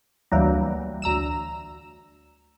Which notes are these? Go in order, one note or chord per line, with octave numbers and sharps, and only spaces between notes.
D2 E3 F#3 G3 A#3
D2 A#5 E6 E7